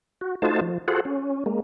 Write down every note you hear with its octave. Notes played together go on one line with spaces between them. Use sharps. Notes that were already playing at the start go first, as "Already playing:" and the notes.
F#4
A3 D#4 F4 F#4 C5 A5
F3
F4 F#4 G#4 A4 C5 F#5
C#4
G#3 A#3